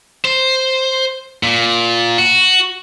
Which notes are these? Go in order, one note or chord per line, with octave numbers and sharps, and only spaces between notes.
C5
A#2
F#4